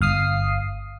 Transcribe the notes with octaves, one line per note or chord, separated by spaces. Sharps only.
G1 F5 D#6 C7